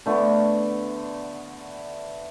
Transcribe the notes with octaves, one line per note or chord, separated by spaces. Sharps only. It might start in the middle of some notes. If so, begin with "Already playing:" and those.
D3 A3 B3